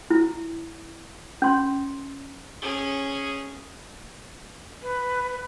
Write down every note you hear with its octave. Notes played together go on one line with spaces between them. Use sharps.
E4
C#4 C6
C#4 G#4
B4